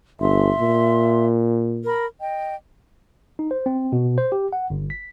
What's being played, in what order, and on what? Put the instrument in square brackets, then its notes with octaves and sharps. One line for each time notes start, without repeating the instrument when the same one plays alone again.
[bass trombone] G1 [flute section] E5 C6
[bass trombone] A#2
[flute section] A#4 B5
D#5 G5
[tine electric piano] D#4
C5
C4
B2
C5
G4
F#5
G1
B6